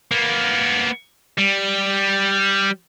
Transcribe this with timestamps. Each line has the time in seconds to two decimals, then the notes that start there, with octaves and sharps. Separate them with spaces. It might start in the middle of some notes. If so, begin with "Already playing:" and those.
0.11 A#3 B3
1.38 G3